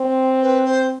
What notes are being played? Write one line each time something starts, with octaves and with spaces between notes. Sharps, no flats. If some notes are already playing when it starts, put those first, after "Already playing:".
Already playing: C4
B4
C5